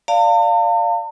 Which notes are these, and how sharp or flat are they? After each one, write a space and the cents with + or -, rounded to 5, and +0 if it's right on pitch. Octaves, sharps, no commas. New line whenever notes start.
D5 +0 F5 +0 A5 +45